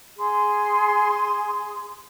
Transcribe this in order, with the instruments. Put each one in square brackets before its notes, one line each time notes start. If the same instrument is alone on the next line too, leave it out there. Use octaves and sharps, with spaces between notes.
[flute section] G#4 C6